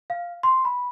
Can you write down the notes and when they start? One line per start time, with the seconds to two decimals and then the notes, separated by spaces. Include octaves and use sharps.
0.10 F5
0.43 C6
0.65 B5